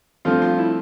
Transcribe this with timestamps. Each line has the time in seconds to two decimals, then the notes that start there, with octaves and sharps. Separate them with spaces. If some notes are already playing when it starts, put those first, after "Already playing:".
0.25 G2 F3 A3 C4 F4
0.42 F4
0.58 E4